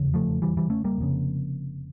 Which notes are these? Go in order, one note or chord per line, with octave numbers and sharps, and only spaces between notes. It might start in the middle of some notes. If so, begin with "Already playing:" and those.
Already playing: F1 E2 C#3
F3 A3
E3 G3
E3 G3
A3 C#4
G3 A#3
F1 F2 C#3